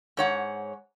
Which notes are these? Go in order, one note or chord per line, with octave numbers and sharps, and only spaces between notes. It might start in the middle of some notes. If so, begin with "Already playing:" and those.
G#2 C#5 F#5